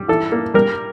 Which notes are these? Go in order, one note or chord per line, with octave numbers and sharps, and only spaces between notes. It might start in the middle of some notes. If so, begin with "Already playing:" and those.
Already playing: G3
E3 A4
A#3
G3 A#4